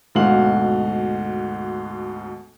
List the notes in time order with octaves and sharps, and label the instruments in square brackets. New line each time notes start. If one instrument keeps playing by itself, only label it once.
[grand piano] D2 G#2 B2 F#4 F5 F#7